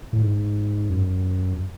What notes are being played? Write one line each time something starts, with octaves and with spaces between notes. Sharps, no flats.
A2
G#2
F#2